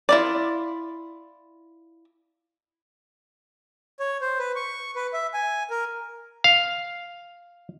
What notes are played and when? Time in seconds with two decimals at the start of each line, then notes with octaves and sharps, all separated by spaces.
0.09 E4 F4 D5
4.00 C#5
4.21 C5
4.39 B4
4.56 C#6
4.96 B4
5.13 E5
5.34 G#5
5.70 A#4
6.44 F5